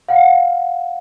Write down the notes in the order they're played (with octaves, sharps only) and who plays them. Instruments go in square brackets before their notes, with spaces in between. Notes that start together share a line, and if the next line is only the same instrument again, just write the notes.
[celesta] F5 F#5